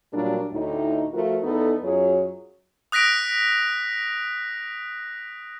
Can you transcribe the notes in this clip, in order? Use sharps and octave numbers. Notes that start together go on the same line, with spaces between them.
A#2 F#3 G3 D4 A#4
D2 A2 D#4
F3 A3 F4 F#4 A#4
E2 B3 D#4 A4
F#2 F#3 F4 G#4 C#5
D#6 F#6 A#6 B6 D7